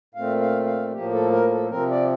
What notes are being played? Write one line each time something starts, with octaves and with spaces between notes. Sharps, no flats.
A#2 A3 C4 F5
F5
F5
A2 F3 A#3 G4
A4
A#4
A4
C3 F3 C4 A#4
D5